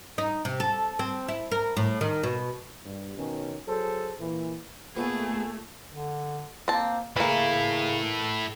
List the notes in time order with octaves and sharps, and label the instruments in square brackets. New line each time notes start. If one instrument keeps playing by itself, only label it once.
[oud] D#4
C3
A4
C4
E4
A#4
A2
D#3
B2
[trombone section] G2
B2 D#3 C#4
F#3 G#4 A4 C5
A#2 E3
[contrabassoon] A#2 [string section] A3 [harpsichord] B3 [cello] G#4
[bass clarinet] D3
[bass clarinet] A#3 [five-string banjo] C4 A5
[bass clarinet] C#3 [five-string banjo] E3 A#3 [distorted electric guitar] E4 A4